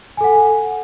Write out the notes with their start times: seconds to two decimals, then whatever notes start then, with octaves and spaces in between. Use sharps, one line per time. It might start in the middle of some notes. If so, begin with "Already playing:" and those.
0.17 G#5
0.21 A4
0.24 F#5